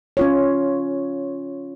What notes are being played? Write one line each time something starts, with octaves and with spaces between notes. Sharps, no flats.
C#4 F4 C#5